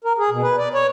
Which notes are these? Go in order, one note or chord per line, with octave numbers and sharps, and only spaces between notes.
A#4
G#4
B2
B4
D5
C#5